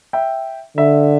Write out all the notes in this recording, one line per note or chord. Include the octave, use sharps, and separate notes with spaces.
E5 G5
D3 E5